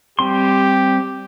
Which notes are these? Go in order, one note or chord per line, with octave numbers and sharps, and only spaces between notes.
G3 C4 G4 C6